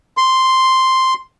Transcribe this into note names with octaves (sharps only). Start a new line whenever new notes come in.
C6